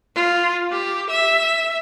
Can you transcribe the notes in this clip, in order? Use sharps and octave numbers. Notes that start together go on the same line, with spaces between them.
F4
G4
E5